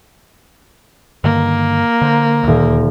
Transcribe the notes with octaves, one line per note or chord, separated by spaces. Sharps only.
G2 D3 D#3 A#3
D3 C5
D#1 D2 F6